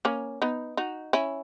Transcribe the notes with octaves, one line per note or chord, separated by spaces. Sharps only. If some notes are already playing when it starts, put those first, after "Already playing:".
A#3 C#4
B3 D#4
D#4 F#4
C#4 E4